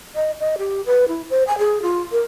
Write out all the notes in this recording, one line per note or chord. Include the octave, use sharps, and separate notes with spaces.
D#5
D#5
G4
B4
E4
C5
G#5
G#4
F4
A#4